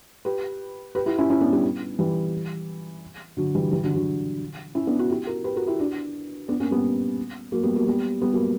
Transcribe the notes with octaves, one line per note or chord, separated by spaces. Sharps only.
G4 B4
G4 B4
E4 G4
C#4 E4
C#4 E4
B3 D4
G3 B3
E3 G3
D3 F#3
E3 G3
E3 G3
D3 F#3
D3 F#3
C#4 E4
B3 D4
D4 F#4
E4 G4
F#4 A#4
G4 B4
F#4 A#4
E4 G4
D4 F#4
B3 D4
A#3 C#4
G3 B3
F#3 A#3
G3 B3
F#3 A#3
G3 B3
G3 B3
F#3 A#3